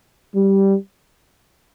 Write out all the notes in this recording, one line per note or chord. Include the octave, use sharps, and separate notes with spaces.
G3